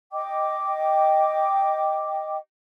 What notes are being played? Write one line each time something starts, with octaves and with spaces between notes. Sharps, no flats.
D#5 G5 D6